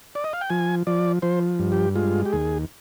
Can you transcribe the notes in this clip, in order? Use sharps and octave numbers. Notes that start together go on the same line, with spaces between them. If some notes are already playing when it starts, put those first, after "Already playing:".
D5
D#5
F5
G5
F3 G#5
F3 D5
F3 C5
G2
G4
G#3 F4
G4
D#2 G#4